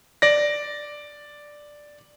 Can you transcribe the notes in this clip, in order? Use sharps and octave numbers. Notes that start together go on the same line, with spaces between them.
D5 A#6